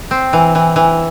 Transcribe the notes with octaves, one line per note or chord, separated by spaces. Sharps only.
C4
E3
E3
E3